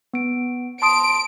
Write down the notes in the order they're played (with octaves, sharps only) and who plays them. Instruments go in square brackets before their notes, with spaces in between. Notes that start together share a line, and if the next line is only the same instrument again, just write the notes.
[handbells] B3 D7
[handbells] A5 C6 D#6 [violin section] D7